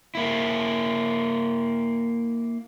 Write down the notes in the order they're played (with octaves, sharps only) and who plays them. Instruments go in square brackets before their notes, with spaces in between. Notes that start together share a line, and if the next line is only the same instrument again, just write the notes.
[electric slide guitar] A#3 E4